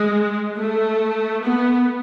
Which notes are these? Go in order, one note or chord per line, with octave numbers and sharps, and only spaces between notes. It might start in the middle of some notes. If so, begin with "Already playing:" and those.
Already playing: G#3
A3
B3